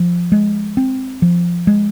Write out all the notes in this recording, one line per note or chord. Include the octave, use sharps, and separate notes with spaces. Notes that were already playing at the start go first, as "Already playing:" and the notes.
Already playing: F3
G#3
C4
F3
G#3